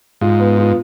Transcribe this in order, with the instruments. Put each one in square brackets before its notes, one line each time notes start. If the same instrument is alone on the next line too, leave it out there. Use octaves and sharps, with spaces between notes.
[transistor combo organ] G#2 [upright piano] F4
[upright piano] B3
F4